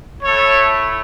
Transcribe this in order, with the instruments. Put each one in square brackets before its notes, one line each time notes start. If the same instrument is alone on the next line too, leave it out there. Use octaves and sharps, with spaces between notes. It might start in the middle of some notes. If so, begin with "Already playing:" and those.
[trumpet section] A3 E4 A4 C#5